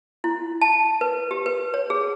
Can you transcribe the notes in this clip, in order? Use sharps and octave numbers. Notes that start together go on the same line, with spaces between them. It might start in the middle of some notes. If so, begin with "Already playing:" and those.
E4
A5
B4
G4
B4
C#5
G#4